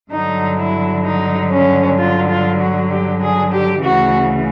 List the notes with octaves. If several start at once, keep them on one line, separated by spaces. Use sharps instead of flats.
G2 D3 F#3 D#4
E4
D#4
C#4
F4
F4
F#4
G4
G#4
G4
D2 C#3 E3 F#4